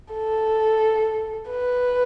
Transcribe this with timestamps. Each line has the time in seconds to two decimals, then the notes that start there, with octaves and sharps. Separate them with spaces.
0.13 A4
1.49 B4